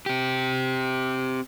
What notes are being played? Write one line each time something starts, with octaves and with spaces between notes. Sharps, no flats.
C4 G4